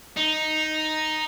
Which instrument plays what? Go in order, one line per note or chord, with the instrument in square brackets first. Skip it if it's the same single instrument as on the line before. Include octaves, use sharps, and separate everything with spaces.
[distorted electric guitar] D#4